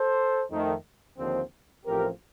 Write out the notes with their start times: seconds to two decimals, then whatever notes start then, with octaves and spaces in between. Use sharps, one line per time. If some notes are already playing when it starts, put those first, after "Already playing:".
Already playing: A4 C5
0.50 F2 D#3 A3
1.18 D#2 D3 F3 C4
1.85 A1 A2 F3 C4 G4 A#4